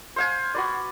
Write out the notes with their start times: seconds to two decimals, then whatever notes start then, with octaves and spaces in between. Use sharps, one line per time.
0.16 C5 F5 G#5
0.54 F#4 B4 D5